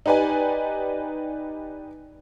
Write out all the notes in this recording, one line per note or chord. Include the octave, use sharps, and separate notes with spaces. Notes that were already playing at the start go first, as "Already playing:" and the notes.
D#4 G4 B4 D5 G#5